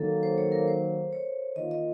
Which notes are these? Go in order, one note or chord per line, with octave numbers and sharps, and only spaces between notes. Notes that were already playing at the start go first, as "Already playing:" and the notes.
Already playing: D#3 F#3 A#3 A4
C5
C#5
A#4
C5
C#5
D#3 A#3 F4 D#5
D#5